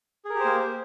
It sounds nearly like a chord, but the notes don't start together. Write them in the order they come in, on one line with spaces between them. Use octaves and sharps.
G#4 A#4 G4 C5 A#3